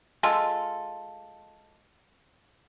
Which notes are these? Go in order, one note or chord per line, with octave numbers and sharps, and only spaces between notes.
G#3 F4 A4